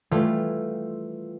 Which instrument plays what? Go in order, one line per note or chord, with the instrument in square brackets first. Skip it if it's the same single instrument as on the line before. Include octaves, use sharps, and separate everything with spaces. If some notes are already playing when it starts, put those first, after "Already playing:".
[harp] E3 G3 A3 F4